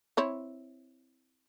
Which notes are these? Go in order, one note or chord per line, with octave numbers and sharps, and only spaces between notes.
C4 E4 C#5